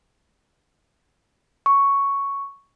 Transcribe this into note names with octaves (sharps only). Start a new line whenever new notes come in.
C#6